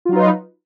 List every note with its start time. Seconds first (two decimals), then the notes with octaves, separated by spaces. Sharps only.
0.05 F4
0.09 F#3
0.12 D#4
0.16 B4